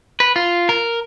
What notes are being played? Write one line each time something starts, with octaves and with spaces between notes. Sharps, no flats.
B4
F4
A#4